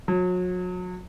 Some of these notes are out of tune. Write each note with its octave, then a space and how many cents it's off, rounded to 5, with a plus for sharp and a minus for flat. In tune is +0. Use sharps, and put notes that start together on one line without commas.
F#3 -35